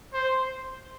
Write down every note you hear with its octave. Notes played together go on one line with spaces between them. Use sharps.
C5